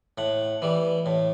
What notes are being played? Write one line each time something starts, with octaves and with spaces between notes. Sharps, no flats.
A2 F#5
E3 G3
A2